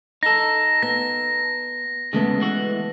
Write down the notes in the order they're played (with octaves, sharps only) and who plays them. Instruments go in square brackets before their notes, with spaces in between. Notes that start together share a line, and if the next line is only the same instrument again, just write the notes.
[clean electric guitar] D#4 A4 [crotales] A#6
[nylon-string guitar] B3 [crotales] A#6
[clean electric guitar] E2 C#3 [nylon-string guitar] G#3 A3 B3
[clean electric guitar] E3 F#4